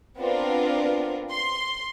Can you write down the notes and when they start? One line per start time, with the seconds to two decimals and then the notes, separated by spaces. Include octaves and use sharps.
0.17 B3 C4 D4 F4 A#4
1.31 C6